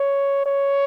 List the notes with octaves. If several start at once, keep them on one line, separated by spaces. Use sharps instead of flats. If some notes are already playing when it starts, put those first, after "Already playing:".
Already playing: C#5
C#5